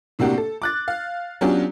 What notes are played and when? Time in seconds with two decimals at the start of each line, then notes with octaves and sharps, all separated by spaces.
0.19 A2 C3 A#3 D4 F#4 G4
0.38 A4
0.62 D6 F#6 A6
0.88 F5
1.41 F#3 B3 C#4 D4 F4 G4